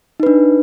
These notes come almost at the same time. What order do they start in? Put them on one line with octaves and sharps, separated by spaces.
D#4 B4 D4